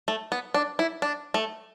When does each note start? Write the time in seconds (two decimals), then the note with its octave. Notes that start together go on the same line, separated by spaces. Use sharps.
0.08 A3
0.32 B3
0.54 D4
0.79 E4
1.02 D4
1.34 A3